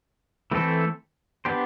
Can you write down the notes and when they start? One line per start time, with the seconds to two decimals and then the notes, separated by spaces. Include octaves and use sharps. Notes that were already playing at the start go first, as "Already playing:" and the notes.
0.51 E3 A3 C4 E4 A4
1.45 B3 D4 G4 C5